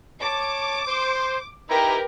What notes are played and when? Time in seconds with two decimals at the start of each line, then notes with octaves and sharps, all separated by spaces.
0.22 C#5 A5 D6
0.86 C5
1.69 D#4 E4 G4 A#4 B4 A#5